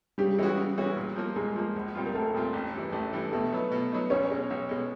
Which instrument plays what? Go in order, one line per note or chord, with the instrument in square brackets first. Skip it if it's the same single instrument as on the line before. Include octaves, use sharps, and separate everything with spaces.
[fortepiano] C#3 [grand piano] G3 G4
[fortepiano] E3 G#3 C#4 F#4
C#3
E3 G#3 C#4 F#4
A#2
F3 A#3
[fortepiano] A#2 [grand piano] G#3 G#4
[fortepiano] F3 A#3
A#1
A#2 G3 C4 F4
[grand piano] A#4
[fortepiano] A#1 [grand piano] A3 A4
[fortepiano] A#2 G3 C4 F4
A1
G2 E3
[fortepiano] A1 [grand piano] A3 A4
[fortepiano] G2 E3
[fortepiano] B2 [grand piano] A3 A4
[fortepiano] F#3 B3 D#4
B2
F#3 B3 D#4
[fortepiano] B1 [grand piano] C#4 C#5
[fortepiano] B2 G#3
B1
B2 G#3